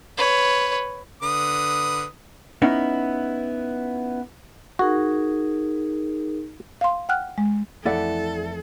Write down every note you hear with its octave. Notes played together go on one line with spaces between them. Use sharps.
B4 C#5
D3 B4 D#6
B3 C#4 D#4 E4
D#4 F#4 G#4 A#4
F5 C6
F#5 G5 F6 F#6
G#3
F2 E3 A3 E4 A4 D5 F#5